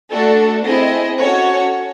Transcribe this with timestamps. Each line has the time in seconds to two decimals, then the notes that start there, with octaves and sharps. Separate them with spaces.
0.10 A3 D4 F#4 A4
0.64 C4 E4 G#4 D#5
1.18 C#4 F#4 A4 C#5